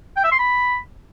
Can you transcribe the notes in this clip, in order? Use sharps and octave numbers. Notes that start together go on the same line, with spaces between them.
G5
E5
C6
B5